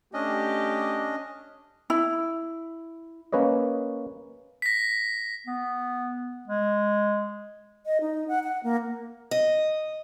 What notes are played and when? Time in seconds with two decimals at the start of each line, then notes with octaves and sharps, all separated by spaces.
0.14 A3 C#4 D4 G4 D#5
1.90 E4
3.32 A#3 C#4 B4 C#5 D#5
4.62 A#6 B6
5.47 B3
6.48 G#3
7.86 D#5
8.01 D#4
8.28 F#5
8.43 F#5
8.64 A#3
9.31 D#5